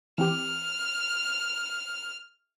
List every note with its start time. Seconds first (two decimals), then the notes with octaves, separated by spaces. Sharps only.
0.18 E3 C4 G4 F6